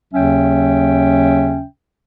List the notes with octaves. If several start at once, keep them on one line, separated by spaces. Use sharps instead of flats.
D#2 C#3 F#3 C#4 E5 G5